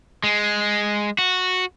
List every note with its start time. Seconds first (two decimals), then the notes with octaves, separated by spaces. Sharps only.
0.24 G#3
1.18 F#4